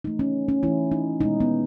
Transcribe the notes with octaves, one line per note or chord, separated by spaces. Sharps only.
E3 A3 D#4
C#4
C#4
E3 A3 E4
D#4
B2 G#3 B3 D#4
B3